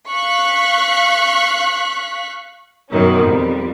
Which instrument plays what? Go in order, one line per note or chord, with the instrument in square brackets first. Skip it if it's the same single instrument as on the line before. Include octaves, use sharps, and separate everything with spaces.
[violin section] F5 C#6 F#6 B6
[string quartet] F#2 B2 D#3 F#3 C#4
F2 G3